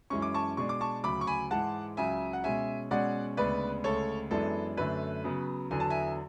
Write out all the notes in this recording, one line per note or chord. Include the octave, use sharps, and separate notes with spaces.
F#2 E3 G#3 C#4 C#6
D6
A5 C#6
B2 G#3 D4 C#6
D6
A5 C#6
D2 C#3 F#3 B5 D6
C#6
G#5 B5
G#2 E3 G#3 F#5 A5
C#2 C#3 F#3 E5 G#5
F#5
B2 G#3 C#4 E5 G#5
B2 G#3 C#4 D5 F#5
D2 C#3 G#3 B3 D4 B4 D5
D2 C#3 G#3 A4 C#5
F#2 E3 G#3 B3 D4 A4
F#2 D3 A3 B4
C#3 F#3 B3
E2 D3 F#3 B3 G#5
A5
E5 G#5